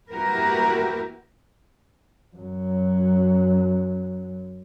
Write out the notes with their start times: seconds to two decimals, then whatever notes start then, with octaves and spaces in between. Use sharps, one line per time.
0.11 A#3 E4 F#4 G4 A#4 B4
2.36 F#2 F#3